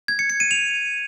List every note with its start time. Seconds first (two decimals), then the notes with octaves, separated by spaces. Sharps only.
0.08 G#6
0.19 C#7
0.30 C#7
0.40 D#7
0.51 F7